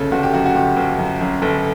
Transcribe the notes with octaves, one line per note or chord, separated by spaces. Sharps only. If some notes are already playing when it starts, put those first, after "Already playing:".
Already playing: G1 C#3 A4
G1 F#4
G4
F#2 F#4
F#4
G1 G4
G1
F#2
F#2
G1 A4